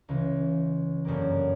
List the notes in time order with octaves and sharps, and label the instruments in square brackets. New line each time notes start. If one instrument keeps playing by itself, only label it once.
[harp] C#2 C#3 E3
G1 F#2 C#3 G3 A#3